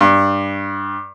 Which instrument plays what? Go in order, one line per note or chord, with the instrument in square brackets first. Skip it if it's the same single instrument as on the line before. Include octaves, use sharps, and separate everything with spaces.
[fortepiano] G2